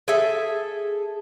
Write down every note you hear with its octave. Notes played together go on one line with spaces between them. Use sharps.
G#4 A4 E5